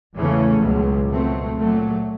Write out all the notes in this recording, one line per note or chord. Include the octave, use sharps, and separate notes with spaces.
E2 C#3 E3 A3 C#4
C#2 B2 F#3
B2 F#3 A3 C4
A#2 F#3 A3